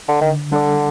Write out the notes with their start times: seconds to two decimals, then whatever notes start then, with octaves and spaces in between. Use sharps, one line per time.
0.09 D3
0.21 D3 D#3
0.51 D3 G3 D4 A4 D5